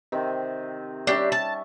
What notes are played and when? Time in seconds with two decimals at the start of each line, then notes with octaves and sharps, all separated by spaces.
0.12 C3 D#3 C4
1.07 G3 C#4 D4 G4 E5
1.32 A5